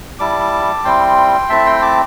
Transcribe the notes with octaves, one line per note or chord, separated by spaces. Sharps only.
G3 E4 A5 D6
G3 C4 E4 G5 C6
A3 C4 E4 E5 A5
G5 C6
A5 D6